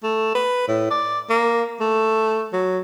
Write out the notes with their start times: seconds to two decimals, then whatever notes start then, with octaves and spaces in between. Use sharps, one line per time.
0.03 A3
0.35 B4
0.68 A2
0.90 D5
1.30 A#3
1.80 A3
2.53 F#3